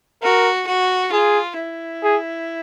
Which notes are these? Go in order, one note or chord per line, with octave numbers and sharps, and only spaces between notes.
F#4 A#4
F#4
F4 G#4
E4
G#4